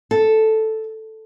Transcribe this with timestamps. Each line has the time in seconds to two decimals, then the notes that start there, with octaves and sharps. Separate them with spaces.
0.11 A4